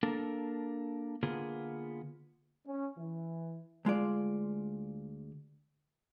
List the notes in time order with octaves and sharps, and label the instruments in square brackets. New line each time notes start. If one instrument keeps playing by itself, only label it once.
[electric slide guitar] A#3 D4 A4 A#4
D3 A#3 B3 F4 G#4
[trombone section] C#4
E3
[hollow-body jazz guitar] D2 G#3 F4 D5